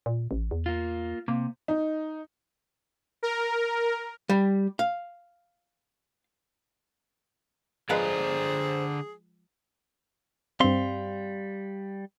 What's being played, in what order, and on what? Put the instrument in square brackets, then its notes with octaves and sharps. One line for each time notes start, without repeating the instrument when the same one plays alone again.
[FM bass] A#2
A1
E2
[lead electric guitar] A#3 F4
[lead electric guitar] C3 [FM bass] A#3
[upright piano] D#4
[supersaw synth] A#4
[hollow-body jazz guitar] G3
F5
[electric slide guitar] D3 D5 A#5 [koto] F3 G#3 B4 [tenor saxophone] G#4 [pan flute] C5
[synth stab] G2 C4 [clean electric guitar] G3 F5 C6